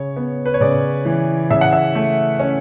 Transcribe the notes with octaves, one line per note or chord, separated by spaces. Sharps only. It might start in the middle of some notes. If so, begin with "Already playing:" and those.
Already playing: C#3 C#5
B3
B4
C#5
C#3 D5
E3
C#3 E5
F#5
E5
A3
C#4